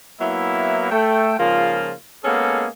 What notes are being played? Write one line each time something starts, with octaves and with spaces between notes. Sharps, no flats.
F#3 A#3 B3 E4
A3 G5
G#2 C#3 F3 A#3 F4
G#3 A#3 B3 C#4 G#4 A4